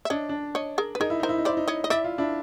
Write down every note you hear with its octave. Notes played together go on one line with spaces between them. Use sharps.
E5
D4 C#5 D#5
D4
C#5 D#5
G#4 A#4
B4
D#4 G#4 A#4
E4
D#4 A#4 C5
E4
D#4
E4 C5 D5
D#4
C#5 D#5
D#5
E4 D5 E5
F4
D4 E4